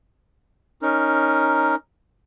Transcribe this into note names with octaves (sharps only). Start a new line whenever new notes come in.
C#4 D#4 A#4